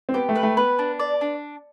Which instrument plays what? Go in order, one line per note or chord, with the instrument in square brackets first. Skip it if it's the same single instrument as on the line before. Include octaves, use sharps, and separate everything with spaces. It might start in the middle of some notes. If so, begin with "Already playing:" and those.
[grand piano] C4
[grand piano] B3 [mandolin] G4
[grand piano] A3
[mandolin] B4
[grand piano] A3
[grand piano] B3 [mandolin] B4
[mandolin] D4
D5
D4